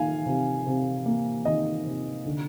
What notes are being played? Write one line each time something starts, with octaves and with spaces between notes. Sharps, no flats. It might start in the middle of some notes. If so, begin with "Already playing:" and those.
Already playing: D#3 A#3 F5 G#5
C3
C3
A#3
D#3 D#5
C3
D3